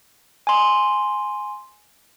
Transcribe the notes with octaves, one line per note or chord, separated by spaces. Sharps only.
G#5 C6